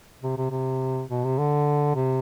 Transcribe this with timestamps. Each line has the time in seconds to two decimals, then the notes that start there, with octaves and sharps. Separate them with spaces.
0.23 C3
0.37 C3
0.51 C3
1.09 B2
1.24 C3
1.38 D3
1.95 C3